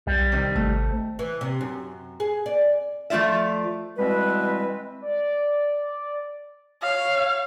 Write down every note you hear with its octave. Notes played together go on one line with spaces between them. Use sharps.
B1 G3
C3 D#3
G#1 A3
E3
C3
F#2
G#4
D5
F3 A3 C#4 F4 D5 E5
B2 E3 G3 G#3 C4 B4
D5
C#5 F5